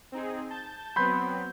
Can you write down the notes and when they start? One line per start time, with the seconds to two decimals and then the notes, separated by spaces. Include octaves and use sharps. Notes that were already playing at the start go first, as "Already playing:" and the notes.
0.12 C4 D#4 G#4
0.50 A5 G6 A6
0.96 F#3 B3 C4 B5 C6 G6